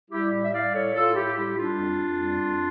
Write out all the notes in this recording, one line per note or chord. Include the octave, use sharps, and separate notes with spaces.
G3 E4 G4
A2
E5
G3 D5 F5
A2 A4 C#5
A2 F4 A4
A2 E4 G4
G3 E4 G4
G3 D4 F4
F2
F2
G3
F2